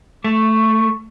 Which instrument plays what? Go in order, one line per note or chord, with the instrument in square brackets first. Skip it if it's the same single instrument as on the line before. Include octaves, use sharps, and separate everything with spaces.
[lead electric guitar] A3 [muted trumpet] C#6